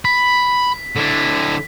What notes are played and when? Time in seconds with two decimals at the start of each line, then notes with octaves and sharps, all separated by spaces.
0.05 B5 B6
0.96 D3 E4